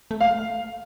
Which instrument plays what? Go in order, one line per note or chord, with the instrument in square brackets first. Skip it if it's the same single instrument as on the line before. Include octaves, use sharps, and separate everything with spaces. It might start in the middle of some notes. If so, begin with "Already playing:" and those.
[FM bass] A3
[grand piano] F5